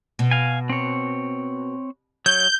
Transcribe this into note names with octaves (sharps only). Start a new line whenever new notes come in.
B2
F5 G#5
C4 C#5
F#3 C#5 G6